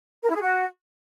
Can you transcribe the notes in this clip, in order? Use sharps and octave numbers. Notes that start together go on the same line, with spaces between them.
A#4
E4
G#4
F#4